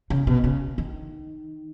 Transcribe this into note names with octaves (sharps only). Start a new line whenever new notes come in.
C#3
B2
C#3
D#3